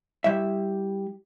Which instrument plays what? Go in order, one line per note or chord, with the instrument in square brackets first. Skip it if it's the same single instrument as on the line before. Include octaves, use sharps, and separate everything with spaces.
[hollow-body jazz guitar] G3 E4 E5